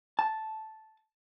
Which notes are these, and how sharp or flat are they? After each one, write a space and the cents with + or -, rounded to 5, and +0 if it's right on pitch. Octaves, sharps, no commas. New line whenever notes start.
A5 -5